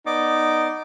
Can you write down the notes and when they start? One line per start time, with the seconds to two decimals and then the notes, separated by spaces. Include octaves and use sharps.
0.06 B3 D#4 D5 D6